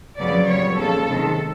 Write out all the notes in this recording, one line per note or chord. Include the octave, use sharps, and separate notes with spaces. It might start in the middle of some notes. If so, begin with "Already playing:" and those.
F2 C#3 F#3 B3 D5
A#2 G3 B3 C#5
D#2 C#3 F3 G#3 A4
C3 D#3 G#3